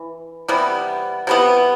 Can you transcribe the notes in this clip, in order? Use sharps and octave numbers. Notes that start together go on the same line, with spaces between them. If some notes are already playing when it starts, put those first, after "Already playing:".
Already playing: E3
C3 E3 G3 B3
C3 E3 G3 B3